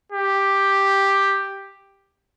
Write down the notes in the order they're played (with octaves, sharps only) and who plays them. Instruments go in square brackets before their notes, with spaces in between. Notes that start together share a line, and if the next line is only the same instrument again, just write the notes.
[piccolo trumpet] G4